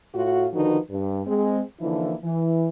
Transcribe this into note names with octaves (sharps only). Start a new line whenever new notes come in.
A2 F4 F#4
D3 D#3 F3 D#4 F#4 B4
G2
G#3 C4 G#4
D3 E3 F3 A#3 D#4 E4
E3